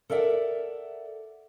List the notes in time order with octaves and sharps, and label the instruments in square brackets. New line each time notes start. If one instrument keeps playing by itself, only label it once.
[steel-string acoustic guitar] A4 A#4 D5 E5 F#5